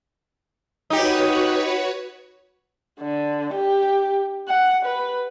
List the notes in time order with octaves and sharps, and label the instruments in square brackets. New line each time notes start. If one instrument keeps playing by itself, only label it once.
[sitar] D#4 G4 [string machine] F#4 B4 C#5
[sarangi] D3
G4
F#5
B4